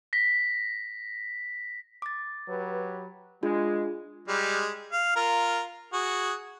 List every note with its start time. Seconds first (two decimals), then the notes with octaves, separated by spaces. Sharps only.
0.13 A#6 B6
2.02 D6 A6
2.48 F#3 G4 B4
3.43 G#3 D4 F4 G#4
4.28 G3 G#3
4.92 F5
5.16 F4 A#4
5.93 F#4 G#4